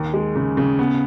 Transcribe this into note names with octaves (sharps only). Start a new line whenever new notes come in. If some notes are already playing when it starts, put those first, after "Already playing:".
Already playing: D#2
G#3
C#3
C#3
B3